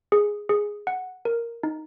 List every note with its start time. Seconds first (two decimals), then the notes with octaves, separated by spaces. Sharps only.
0.12 G#4
0.49 G#4
0.87 F#5
1.25 A#4
1.63 D#4